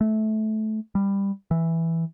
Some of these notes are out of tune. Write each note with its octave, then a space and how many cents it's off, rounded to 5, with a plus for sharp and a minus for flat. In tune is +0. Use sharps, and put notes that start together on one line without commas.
A3 -20
G3 +15
E3 +0